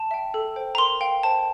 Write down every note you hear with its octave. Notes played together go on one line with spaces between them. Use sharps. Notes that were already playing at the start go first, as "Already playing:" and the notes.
Already playing: A5
E5 G5
A4
C5 G5
A#5
A#4 C6
F5 G5
C5 A5